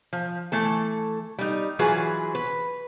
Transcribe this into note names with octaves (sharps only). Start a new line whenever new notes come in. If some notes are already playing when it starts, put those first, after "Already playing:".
F3
E3 A3 A4
G3 D#4
E3 F#3 F4 F#4 G#4 B4
B4